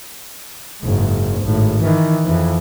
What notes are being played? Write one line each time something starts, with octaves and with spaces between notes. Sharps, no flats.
F#1 G#2
G#1 A2
D#3 E3
F2 E3